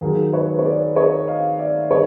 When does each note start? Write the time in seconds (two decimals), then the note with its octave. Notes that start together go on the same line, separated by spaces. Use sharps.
0.01 D#2 D#3 F#3 G#4 A#4
0.33 B4 C#5
0.59 C#5
0.65 C5 D5
0.96 C#5 D#5
1.27 D#5 F5
1.59 D5 E5
1.90 D#3 G3 C#5 D#5